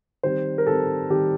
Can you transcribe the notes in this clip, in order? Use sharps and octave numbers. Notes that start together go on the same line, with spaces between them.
D#3 G3 C4 C5
A#4
D#3 G3 C4 A4
D#3 G3 C4 G4